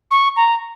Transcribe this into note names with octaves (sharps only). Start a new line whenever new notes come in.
C#6
A#5